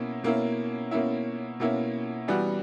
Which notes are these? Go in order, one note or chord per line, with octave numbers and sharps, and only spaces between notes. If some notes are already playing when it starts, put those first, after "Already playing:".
Already playing: B2 A#3 C#4 E4
B2 A#3 C#4 E4
B2 A#3 C#4 E4
B2 A#3 C#4 E4
E3 G3 B3 F#4